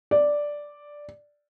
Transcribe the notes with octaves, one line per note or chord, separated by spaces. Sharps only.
D5